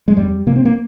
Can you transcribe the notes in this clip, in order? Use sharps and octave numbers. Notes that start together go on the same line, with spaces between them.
G#3
F2 G3
C3 A#3
C4
A#3